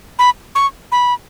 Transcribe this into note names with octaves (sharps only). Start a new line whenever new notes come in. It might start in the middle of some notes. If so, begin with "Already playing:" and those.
B5
C#6
B5